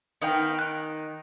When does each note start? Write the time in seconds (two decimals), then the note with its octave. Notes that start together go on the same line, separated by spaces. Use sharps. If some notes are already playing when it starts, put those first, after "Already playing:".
0.22 D#3 B3 F5 G5
0.59 F#6